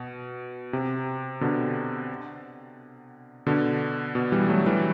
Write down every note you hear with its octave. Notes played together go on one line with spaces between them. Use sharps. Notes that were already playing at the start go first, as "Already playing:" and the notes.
Already playing: B2
C3
B2 D3
B2 D3
B2
E3 G3
F#3 A3
E3 G3